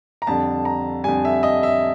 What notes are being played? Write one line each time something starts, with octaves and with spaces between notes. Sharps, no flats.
A#5
F2 D3 G3 A5
A#5
F2 D3 G3 G#5
E5
D#5
E5